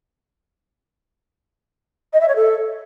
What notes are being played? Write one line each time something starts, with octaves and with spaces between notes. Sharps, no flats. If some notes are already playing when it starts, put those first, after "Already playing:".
D#5
E5
C#5
A4